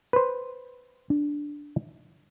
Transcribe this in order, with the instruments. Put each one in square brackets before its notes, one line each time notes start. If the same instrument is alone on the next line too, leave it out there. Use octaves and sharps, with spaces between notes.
[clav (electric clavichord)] B4 C5
[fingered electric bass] D4